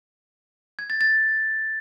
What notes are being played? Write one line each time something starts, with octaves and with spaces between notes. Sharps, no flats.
G#6
A6
A6